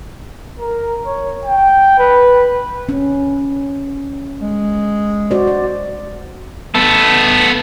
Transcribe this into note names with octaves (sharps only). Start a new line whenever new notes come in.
A#4
C#5
G5
B4
C#4
G#3
F#4 C5 D5
D5
B3 A4